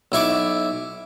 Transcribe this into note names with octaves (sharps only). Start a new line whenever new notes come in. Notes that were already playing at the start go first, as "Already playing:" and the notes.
B1 E4 C#6 D6